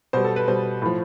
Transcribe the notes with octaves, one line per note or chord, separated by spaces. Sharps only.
B2 G3 C5
A4
B4
B2 G3 C5
A2 F3